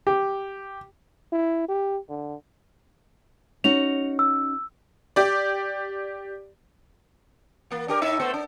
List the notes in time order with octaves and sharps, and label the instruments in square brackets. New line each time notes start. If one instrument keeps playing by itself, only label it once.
[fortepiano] G4
[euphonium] E4
G4
D3
[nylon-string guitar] C#4 D#4 F#4 [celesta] F7
[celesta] E6
[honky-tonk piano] G4 D5
[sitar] E3 A#3
D4 G4 A#4
A2 D#4 E5
A3 B3 C5
D4